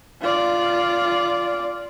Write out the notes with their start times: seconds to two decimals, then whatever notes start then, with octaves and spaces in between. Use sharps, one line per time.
0.21 F4 D5